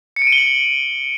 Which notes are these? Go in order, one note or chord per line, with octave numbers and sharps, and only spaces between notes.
C#7
D7
D#7
G7
F#7